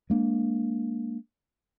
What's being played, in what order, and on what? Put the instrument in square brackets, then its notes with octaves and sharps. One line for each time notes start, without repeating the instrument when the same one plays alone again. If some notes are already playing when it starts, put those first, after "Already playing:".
[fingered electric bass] G#3 A#3 D4